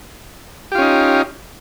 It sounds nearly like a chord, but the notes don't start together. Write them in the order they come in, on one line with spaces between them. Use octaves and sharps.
G4 F4 C#4 D#4